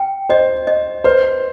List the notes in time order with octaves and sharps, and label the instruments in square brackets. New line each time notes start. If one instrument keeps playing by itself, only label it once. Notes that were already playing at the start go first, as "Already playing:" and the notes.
Already playing: [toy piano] G5
[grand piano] C5 [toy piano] D#5
[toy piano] D#5
[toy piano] B4 [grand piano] C5